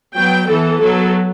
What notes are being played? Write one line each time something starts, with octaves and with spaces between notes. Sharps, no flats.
F#3 B3 G5
E3 B3 A4
F#3 B3 A4